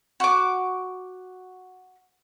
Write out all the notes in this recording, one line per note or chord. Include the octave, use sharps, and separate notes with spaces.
F#4 D6